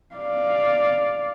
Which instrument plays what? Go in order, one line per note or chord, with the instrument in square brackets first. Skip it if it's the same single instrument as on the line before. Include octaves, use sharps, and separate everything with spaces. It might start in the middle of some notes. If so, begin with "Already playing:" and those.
[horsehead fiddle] D5 F5